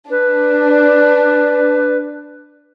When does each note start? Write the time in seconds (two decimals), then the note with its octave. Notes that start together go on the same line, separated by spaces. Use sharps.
0.11 D4 B4